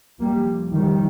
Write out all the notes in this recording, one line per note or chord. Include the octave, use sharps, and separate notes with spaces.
F2 C3 G3 A#3
D#3 G3